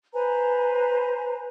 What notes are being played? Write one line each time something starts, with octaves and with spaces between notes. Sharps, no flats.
B4 C5 G#5 A#5